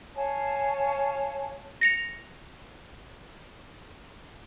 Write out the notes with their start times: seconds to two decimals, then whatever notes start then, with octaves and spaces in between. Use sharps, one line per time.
0.15 C#5 F5 G#5 A5
1.81 A#6 C#7 F7